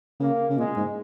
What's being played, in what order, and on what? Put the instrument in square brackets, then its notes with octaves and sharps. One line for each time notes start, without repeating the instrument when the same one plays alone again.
[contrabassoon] C#3 [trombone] A#3
[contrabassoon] C#3
[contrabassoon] A#2 [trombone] G#3
[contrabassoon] G#2